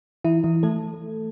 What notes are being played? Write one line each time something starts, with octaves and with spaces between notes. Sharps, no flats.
E3 E4
E3 E4
A3 A4